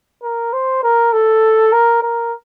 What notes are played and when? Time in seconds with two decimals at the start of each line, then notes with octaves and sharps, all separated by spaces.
0.23 A#4
0.53 C5
0.83 A#4
1.13 A4
1.73 A#4
2.02 A#4